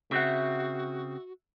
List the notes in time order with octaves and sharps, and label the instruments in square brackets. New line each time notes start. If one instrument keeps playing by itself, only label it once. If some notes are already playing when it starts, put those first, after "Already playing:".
[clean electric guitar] C#3 C4 [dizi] F#4 [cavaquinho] E5 F#5